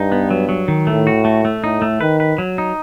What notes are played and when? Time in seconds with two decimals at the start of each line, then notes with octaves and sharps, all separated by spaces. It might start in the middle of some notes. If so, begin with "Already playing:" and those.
Already playing: G2 D#4
0.12 B3
0.31 F#3
0.49 F#3
0.68 D#3
0.87 A2 A3
1.07 F#4
1.25 A3
1.45 A3
1.63 A2 D#4
1.82 A3
2.01 D#3 B4
2.20 B4
2.38 F#3
2.58 D#4